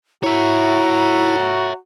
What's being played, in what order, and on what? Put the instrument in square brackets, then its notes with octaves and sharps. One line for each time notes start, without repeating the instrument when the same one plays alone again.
[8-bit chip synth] E4 [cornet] F#4 [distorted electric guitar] C#5 E5 [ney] A#5